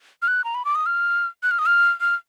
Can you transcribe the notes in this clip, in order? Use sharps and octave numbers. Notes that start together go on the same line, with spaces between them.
F6
F#6
A#5
B5
D6
D#6
F6
F#6
F6
D#6
F6
F6